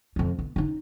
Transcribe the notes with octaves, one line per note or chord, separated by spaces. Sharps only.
F2 C#4
B3
C#4 D#4